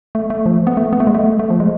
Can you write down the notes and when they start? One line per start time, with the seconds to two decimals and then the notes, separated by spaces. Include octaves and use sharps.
0.15 A3
0.30 A3
0.46 F3
0.67 B3
0.77 A3
0.93 B3
1.00 A3
1.07 G#3
1.15 A3
1.39 A3
1.50 F3
1.60 G#3